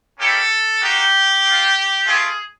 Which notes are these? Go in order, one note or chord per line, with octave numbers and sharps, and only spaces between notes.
A#3 C#4 E4 G4 A4
A#3 D#4 F#4 G4
C4 F4
A3 C4 F4 G#4